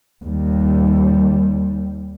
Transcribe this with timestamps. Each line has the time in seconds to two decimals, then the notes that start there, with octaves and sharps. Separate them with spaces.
0.24 D#2 G3